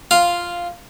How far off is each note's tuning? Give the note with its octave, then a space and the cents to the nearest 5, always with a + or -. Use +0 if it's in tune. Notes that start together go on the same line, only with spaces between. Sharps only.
F4 -5 F5 +0